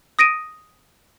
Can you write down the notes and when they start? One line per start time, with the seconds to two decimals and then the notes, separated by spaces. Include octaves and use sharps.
0.19 D#6 A#6 D7 D#7